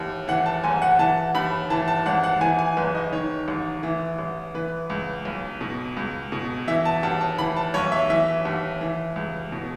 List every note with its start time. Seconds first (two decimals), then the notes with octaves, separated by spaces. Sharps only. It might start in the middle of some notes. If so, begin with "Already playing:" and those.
Already playing: D#2 E3
0.28 E3 F#5
0.46 A5
0.64 F#1 G#5
0.82 F#5
0.99 E3 A5
1.35 D#2 B5
1.70 E3 A5
1.88 A5
2.06 G#1 F#5
2.24 F#5
2.41 E3 G#5
2.59 G#5
2.77 F#1 B4
2.95 D#5
3.12 D#3 C#5
3.48 A1
3.83 E3
4.19 A1
4.54 E3 B4
4.90 C#2
5.25 B1
5.61 B2
5.97 C#2
6.32 B2
6.68 E3 E5
6.85 A5
7.03 D#2 A5
7.21 A5
7.38 E3 B5
7.56 A5
7.74 B1 C#5
7.92 E5
8.10 E3 E5
8.45 D#2
8.81 E3
9.16 C#2
9.52 B2